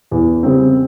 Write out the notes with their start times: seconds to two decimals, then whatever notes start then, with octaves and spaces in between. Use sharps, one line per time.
0.11 E2
0.43 C#3 G3 C4